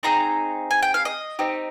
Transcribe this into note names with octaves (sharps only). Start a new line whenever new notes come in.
C4 D#4 G#4 A#5
G#5
G5
F5
D#5
C4 D#4 G4